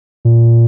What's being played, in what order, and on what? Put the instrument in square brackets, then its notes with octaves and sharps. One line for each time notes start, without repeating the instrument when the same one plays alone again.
[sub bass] A#2